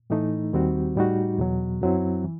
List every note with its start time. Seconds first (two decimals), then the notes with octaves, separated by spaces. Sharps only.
0.10 A2 E3 A3 D#4
0.53 D#2 D#3 G3 C4 F#4
0.96 A2 G3 D#4 F#4
1.38 E2 B2 F#3
1.81 F#2 F#3 C4 E4
2.24 E3